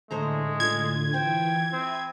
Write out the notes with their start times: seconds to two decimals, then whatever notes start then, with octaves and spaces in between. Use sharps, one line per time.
0.11 A2 D3 G#3 A3 C5 A#5
0.60 F4 G#6
1.14 E3 C5 G5
1.73 C4 E5 B5 D#6